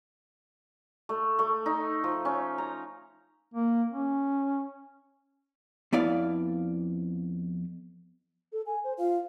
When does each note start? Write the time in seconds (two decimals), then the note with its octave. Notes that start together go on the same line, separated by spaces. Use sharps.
1.09 A3
1.39 A3
1.66 D#4
2.04 F3
2.25 C#4
2.58 A#5
3.54 A#3
3.91 C#4
5.93 F2 B3 E4 D5 F5
8.52 A4
8.66 G#5
8.84 C5
8.98 F4 F5